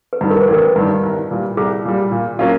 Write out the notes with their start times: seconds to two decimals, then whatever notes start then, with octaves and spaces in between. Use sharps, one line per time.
0.13 B4
0.21 G2 D#3
0.30 A#4
0.42 B4
0.48 A1 A#4
0.76 G2 D#3
1.03 C2
1.31 A#2 G3
1.57 C2 G#4
1.85 A#2 G3
2.12 A#2
2.39 F#3 A#3 C#4 F4